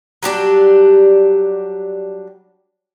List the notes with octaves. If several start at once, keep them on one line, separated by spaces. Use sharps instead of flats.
F#3 G3 D4 G4